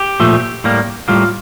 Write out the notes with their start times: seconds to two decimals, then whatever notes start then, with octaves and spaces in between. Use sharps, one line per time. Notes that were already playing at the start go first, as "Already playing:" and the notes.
Already playing: G4
0.20 A#2 F3 A3
0.64 A2 G3 A#3
1.08 A2 G3 A#3 F4